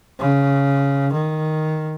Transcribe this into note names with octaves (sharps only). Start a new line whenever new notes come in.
C#3
D#3